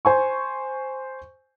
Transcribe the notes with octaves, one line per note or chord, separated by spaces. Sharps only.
C5 G#5 C#6